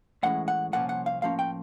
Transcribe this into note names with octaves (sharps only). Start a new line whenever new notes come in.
A2 E3 G#3 C#4 F#5
F#5
C2 A#2 F3 A#3 C#4 F#5
F#5
F5
A2 F3 A#3 C#4 F5
G5